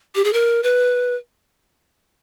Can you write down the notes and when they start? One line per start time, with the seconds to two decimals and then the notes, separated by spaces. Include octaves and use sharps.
0.15 G4
0.24 G#4
0.33 A#4
0.63 B4